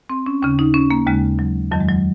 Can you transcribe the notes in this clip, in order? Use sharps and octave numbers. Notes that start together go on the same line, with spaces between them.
C4
C#4
D#2 C#3 C#4
D#4
C#4
A#3
D#2 C#3 G#3
F#3
F2 D#3 F#3
G#3
F#3